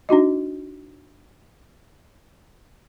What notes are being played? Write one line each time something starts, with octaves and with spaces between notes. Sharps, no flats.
D4 D#4 F#4 D#5